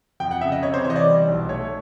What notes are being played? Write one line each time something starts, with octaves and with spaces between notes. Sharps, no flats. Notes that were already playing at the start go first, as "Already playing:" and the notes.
F2 G5
F#5
C#3 E5
D#5
C3 C#5
C5
E3 C#5
D#5
D5
G3
B1
A3 C#5